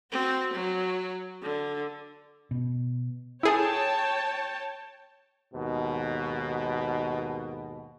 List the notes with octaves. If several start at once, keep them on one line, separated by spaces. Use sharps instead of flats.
C4 F#4
F#3
D3
B2
E4 G#4 A4 C#5 G5 A5
D#2 G#2 B2